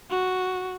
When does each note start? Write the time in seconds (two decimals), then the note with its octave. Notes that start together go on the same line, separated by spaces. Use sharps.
0.11 F#4